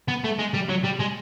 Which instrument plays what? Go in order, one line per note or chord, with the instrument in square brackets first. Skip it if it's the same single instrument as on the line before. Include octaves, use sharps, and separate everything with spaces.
[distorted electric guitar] B3
A3
G#3
G3
F#3
G3
G#3